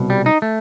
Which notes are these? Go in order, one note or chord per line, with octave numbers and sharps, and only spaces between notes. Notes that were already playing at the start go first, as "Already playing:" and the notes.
Already playing: C2 B2
G3
D#4
A3